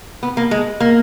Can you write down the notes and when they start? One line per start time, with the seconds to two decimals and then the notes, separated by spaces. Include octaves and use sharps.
0.23 B3
0.37 A#3
0.51 G#3
0.80 A#3